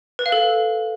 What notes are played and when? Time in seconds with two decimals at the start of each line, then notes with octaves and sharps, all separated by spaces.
0.19 B4
0.26 F5
0.32 A4